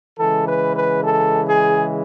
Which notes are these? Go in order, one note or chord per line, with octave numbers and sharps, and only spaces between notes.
C#3 E3 G#3 A4
B4
B4
A4
G#4